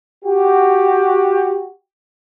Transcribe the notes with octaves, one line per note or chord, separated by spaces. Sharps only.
F#4 G4